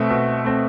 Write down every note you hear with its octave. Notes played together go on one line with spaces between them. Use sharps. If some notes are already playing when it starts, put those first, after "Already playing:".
Already playing: B2 A3 C4 E5
B2
A3 C4